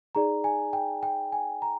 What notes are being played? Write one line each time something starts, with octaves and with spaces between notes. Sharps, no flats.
D#4 G#4 D5 A#5
G#5
G5
G5
G#5
A#5